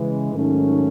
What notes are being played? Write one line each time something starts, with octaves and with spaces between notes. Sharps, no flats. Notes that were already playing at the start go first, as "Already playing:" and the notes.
Already playing: C#3 E3 G#3
G#2 D#3 F#3 A3 C#4